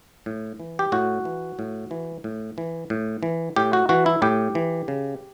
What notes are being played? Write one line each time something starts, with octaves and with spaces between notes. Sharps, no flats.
A2
E3
G4
A2 F#4
E3
A2
E3
A2
E3
A2
E3
A2 G4
F#4
E3 F#4
E4
A2 G4
E3
C#3